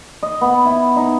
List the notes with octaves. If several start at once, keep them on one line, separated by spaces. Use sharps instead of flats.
D#5
B3
E4
D#4